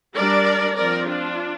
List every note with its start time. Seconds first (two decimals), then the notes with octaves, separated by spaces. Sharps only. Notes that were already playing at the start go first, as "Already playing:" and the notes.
0.15 G3 D4 A#4 D5
0.76 F3 C4 A#4 D5
1.07 D4 F4